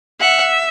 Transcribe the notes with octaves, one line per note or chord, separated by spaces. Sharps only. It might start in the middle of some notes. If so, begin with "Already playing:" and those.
E5 F#5